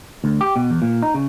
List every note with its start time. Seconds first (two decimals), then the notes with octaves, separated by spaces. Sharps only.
0.24 D2
0.41 G4
0.56 B2
0.70 E2
0.82 A#2
1.02 D#4
1.14 C#3